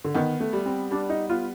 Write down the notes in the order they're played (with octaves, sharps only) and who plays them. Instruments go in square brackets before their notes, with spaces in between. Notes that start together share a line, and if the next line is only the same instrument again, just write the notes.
[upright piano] D3
[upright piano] D#3 [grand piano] B3
[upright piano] A3
[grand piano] G3
[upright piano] C4
[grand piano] G3 [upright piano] D4
[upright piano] D#4
[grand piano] B3 [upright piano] F4